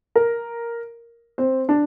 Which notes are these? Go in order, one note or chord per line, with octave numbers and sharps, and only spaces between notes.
A#4
C4 C5
D4 D5